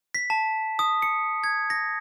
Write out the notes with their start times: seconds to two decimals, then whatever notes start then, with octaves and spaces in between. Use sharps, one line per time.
0.15 B6
0.30 A5
0.79 D#6
1.02 C#7
1.44 G#6
1.70 A#6